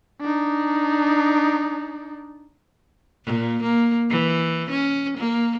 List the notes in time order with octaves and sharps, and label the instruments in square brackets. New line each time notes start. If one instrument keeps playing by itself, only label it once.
[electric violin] D4 D#4
[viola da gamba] A#2
A#3
E3
C#4
A#3